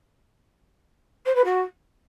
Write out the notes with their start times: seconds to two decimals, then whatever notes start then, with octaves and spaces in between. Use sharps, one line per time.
1.26 C5
1.35 B4
1.45 F#4